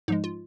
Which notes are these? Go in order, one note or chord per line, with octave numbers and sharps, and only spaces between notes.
G#2 F3 G#3 D#4
F4